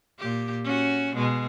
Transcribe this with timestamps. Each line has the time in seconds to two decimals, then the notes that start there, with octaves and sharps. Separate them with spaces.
0.19 A#2 G4
0.64 C#4 F#4
1.16 B2 G#3